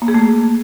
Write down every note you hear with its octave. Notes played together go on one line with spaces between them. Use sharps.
A#3
G#4
A3